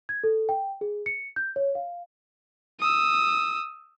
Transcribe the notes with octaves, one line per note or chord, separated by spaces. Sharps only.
G#6
A4
G5
G#4
C#7
G6
C#5
F5
D#6 E6